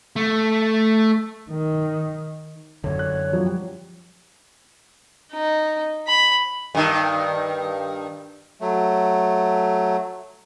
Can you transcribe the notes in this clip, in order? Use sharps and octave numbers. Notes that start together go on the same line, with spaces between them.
A3
D#3
F#2 D3 C#5
F#6
F3 F#3
G3
D#4
B5
G2 D#3
F#3 A3